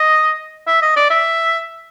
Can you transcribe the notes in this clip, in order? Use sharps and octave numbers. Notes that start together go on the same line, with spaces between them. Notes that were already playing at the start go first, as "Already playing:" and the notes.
Already playing: D#5
E5
D#5
D5
E5